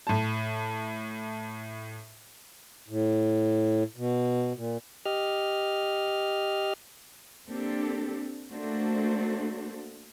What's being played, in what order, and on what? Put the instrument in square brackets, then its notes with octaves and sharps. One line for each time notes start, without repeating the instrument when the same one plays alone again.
[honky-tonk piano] A2 A5
[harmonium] A2
B2
A#2
[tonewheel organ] G4 D#5 F6
[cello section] A#3 C4 D4 G4 A4
A3 A#3 D4 F#4 A4 C5